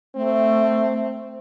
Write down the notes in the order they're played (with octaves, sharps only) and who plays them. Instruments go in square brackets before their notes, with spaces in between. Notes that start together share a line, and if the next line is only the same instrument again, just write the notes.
[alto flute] A3 [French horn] C4